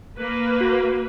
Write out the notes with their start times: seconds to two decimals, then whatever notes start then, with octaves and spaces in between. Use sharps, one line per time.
0.19 A#3 B4
0.61 F#4